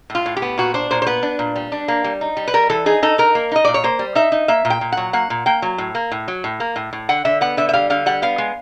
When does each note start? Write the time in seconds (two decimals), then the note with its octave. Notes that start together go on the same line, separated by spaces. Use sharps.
0.10 A2
0.15 F4
0.26 A2
0.37 G4
0.42 B3
0.58 A#2 F#4
0.74 D4 C5
0.91 A#2 C5
1.02 C5
1.07 B3 B4
1.23 D4
1.39 A#2
1.56 G3
1.72 D4
1.88 A#3
2.04 G3
2.21 D#4
2.37 G3
2.48 B4
2.54 G3 A#4
2.70 E3 A4
2.86 D#4 G#4
3.03 D#4 A4
3.18 D#4 A#4
3.35 A#3
3.52 D#4 D#5
3.65 A#2 D5
3.74 C#5
3.84 A#3 C5
3.99 G3
4.15 D#4 E5
4.32 D#4
4.48 A#3 E5
4.65 A#2
4.70 G5
4.81 A#2
4.92 F#3 F#5
5.13 A#3 F#5
5.30 A#2
5.46 A#3 G5
5.62 F#3
5.78 A2
5.95 A#3
6.11 A2
6.28 F#3
6.44 A2
6.60 A#3
6.76 A2
6.93 A2
7.09 D3 F#5
7.25 D3 E5
7.41 B3 F#5
7.57 D3 E5
7.69 E5
7.73 G3 F5
7.90 D3 F5
8.06 G3 F#5
8.22 B3 F5
8.38 G#3